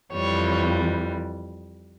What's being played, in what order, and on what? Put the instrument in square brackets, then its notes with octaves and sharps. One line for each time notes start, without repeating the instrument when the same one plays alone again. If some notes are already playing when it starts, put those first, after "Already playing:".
[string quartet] F2 E3 G3 C#5